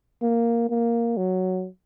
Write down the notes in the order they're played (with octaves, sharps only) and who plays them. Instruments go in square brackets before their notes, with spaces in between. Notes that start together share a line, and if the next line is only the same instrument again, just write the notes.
[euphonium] A#3
A#3
F#3